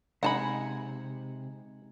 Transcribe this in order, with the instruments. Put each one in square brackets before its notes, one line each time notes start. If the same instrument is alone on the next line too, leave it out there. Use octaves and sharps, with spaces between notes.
[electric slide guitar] C3 [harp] G#3 G#5 [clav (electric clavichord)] D#4 [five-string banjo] F#5 A5 B5